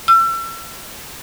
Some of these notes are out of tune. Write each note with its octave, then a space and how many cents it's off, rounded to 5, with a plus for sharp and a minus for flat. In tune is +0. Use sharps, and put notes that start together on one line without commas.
E6 +35